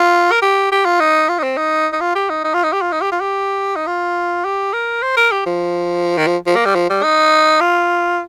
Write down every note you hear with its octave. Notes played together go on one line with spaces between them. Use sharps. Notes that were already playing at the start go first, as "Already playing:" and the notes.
Already playing: F4
A#4
G4
G4
F4
D#4
F4
D#4
C4
D#4
D#4
F4
G4
D#4
D#4
F4
D#4
G4
F4
D#4
G4
F4
G4
D#4
F4
G4
A#4
C5
A#4
G4
F3
D#3
F3
F3
A#3
G3
F3
G3
D#4
F4